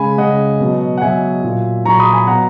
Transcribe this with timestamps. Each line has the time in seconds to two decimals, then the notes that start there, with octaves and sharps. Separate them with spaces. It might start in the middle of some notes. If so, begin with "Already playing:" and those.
Already playing: C#3 G#3 G#5 B5
0.17 C#3 G#3 D#5 F#5
0.60 B2 F#3
0.97 F#5
1.02 B2 F#3 E5 G#5
1.43 A#2 F#3
1.85 A#2 F#3 A#5 C#6
1.99 B5 D#6
2.13 G#5 B5
2.27 B2 F#3 F#5 A#5